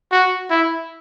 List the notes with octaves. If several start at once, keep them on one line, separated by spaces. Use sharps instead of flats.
F#4
E4